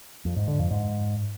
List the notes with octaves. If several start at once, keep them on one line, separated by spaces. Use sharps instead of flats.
F2
G#2
D3
F2
G#2